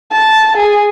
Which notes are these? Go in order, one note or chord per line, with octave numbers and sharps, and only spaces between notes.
A5
G#4